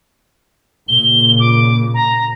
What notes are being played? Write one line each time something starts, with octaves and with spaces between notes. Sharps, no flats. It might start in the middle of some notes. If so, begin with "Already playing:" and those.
A#2 C#3 G7
D6
A#5